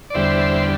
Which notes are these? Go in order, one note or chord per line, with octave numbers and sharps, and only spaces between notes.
D5
E2 D3 G3 C5 E5